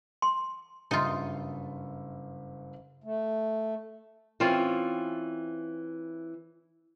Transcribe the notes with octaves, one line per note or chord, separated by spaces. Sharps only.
C6
F#1 G2 D#4 F4 E5
A3
E3 C4 C#4 F4